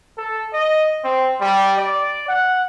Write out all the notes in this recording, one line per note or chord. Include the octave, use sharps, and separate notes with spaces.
A4
D#5
C4
G3
D5
F#5